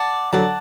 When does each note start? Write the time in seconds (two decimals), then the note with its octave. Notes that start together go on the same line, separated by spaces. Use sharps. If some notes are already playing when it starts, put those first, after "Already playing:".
Already playing: D5 F#5 A5
0.33 D3 F#3 D5 F#5 A5